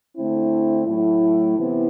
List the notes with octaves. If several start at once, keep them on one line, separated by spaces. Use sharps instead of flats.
D3 A3 C4 E4
A2 F#3 A3 E4
C3 E3 B3 E4